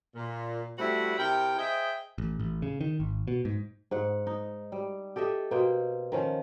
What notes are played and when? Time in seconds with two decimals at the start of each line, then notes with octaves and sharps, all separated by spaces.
0.15 A#2
0.77 G3 A3 C4 E4 F#4 F#5
1.17 C3 E4 A#4 G5
1.57 G#4 C5 D#5 E5 G5
2.18 A1
2.40 A1
2.62 C#3
2.81 D#3
3.00 G#1
3.28 B2
3.45 G#2
3.91 G#2 F#5
4.27 D#4
4.72 G3
5.16 G4 A4 D#5 E5
5.51 B2 A#3 C5 G5
6.12 D#3 F3 C#4